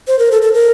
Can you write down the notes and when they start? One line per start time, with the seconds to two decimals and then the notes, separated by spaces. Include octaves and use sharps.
0.08 C5
0.19 A#4
0.32 A4
0.42 A4
0.54 A#4